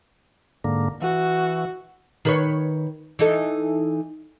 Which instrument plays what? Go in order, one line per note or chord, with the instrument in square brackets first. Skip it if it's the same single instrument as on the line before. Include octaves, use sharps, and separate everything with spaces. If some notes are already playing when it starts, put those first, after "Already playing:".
[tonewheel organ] G#2 D3 A#3
[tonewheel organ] E3 [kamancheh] F#4
[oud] D#3 B4 C#5
E3 D#4 A4